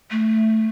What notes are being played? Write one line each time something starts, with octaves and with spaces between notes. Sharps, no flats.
A3